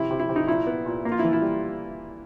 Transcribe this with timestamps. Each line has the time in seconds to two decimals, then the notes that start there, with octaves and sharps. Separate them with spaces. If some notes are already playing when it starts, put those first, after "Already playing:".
Already playing: C3 E4
0.10 C3
0.20 E4
0.29 C3
0.36 D#4
0.47 A#2 E4
0.67 B3
0.86 A#2
1.05 A#3
1.12 F4
1.19 E4
1.24 E3
1.33 E4
1.42 G3